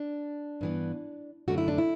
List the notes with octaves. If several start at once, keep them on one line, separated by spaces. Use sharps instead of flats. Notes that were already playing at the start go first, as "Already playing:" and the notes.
Already playing: D4
G2 E3 B3
F#2 D3 A3 F#4
E4
D4
E4